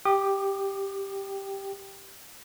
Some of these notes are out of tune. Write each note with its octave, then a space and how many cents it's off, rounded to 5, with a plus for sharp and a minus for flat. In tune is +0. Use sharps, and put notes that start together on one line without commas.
G4 +0 G5 +0 D#6 -45